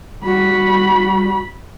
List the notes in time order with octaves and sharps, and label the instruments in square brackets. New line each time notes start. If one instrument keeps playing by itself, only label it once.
[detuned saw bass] G3 [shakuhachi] F#4 [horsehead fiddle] B5